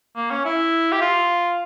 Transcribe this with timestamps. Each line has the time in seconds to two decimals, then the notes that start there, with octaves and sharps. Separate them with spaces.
0.16 A#3
0.31 C#4
0.45 E4
0.92 G4
1.01 F4